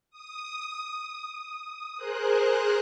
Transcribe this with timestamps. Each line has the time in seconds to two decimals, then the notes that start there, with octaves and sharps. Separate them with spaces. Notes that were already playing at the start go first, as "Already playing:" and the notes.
0.11 D#6
1.97 G#4 A#4 C5 F#6